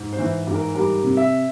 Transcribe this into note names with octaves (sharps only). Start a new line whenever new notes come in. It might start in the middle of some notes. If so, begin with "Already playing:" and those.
Already playing: G#2
C5
E3
G#2
A#4
G3 A#4
C3
E5